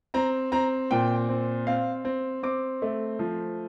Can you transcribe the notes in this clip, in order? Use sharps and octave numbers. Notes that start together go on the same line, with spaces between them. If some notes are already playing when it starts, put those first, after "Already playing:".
C4 A#5
C4 A#5
A#2 G5
C4
C4 F5
C4
C4 D6
A3
F3